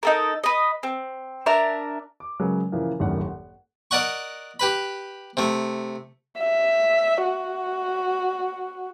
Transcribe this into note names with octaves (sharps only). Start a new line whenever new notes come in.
D#4 A4 A#4
B4 D#5
C4
D4 A#4 E5 A#5
D6
C#3 F#3 G#3 G#4 A#4 B4
A#2 C#3 E3 F3 A#3
D#1 G#1 F#2 A2 D#3 F#5
F#5
A#4 D5 D#5 F#5 C#6
G4 B4 B5
C3 A3
E5
F#4